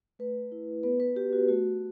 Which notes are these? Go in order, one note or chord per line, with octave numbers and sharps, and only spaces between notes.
A3 B4
E4
B3 B4
B4
F#4 G4
F#4
A3 F#4